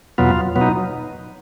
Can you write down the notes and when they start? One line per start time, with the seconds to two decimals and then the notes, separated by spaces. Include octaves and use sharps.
0.18 E2 B2 F#3 B3 F4
0.56 B2 F#3 B3
0.61 D#4